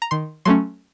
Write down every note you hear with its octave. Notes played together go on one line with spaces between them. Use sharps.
A#5
D#3 C6
F#3 A3 C#4 C6